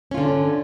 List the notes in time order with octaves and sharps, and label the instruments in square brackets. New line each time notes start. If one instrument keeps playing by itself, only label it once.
[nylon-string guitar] C#4
F4
D3